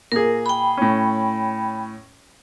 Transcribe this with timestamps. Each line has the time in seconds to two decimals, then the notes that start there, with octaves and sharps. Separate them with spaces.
0.12 A#2 G#4 A#4
0.46 G5 B5
0.77 A2 C#4